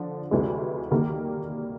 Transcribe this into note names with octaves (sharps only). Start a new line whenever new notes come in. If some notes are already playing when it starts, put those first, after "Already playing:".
Already playing: D3 F3
D2 C3 E3 G#3
D#3 G3 A#3